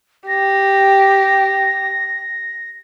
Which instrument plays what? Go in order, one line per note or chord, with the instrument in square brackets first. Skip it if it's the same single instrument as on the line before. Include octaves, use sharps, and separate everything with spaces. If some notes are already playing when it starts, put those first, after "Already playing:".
[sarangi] G4 [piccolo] A#6